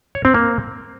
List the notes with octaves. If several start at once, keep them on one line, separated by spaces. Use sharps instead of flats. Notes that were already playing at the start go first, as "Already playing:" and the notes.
C#5
C4
A#3